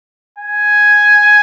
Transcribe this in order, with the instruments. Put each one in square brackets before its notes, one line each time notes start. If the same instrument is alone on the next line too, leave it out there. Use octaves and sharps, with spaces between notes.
[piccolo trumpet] G#5